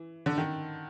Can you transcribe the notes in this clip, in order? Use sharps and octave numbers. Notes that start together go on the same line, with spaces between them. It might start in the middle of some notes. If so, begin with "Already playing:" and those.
Already playing: E3
D3
D#3